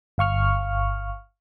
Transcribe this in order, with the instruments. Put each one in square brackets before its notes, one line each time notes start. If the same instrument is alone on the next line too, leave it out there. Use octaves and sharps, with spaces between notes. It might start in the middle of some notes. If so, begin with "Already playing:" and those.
[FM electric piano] G1 F5 C#6 F6